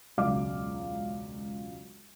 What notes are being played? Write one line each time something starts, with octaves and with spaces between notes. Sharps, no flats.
E1 C#2 F#2 F#3 F5 D6